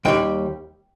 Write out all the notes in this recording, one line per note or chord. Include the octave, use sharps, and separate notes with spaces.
D#2 D#3 G3 G5